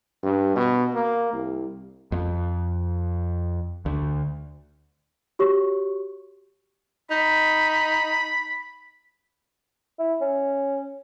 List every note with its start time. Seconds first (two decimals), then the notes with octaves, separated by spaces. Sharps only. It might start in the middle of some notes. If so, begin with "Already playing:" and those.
0.23 G2
0.56 B2
0.94 A#3
1.33 C2
2.12 F2
3.86 D2
5.39 F#4 G4 C#5 C#6
7.10 D#4 B5
9.99 E4
10.21 C#4